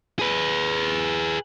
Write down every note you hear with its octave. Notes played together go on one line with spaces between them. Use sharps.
G#4 B4